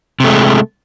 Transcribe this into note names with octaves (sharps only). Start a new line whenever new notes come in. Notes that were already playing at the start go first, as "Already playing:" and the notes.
C3 G#3 A3